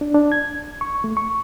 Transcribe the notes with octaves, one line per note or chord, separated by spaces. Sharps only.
D4
D4
G#6
C#6
A3
C#6